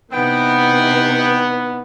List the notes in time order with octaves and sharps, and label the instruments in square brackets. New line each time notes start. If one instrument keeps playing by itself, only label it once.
[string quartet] C3 E3 D#4 [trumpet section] B3 [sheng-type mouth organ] G5